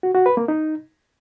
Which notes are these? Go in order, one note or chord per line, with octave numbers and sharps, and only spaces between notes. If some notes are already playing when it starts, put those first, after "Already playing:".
F#4
F#4
B4
A#3
D#4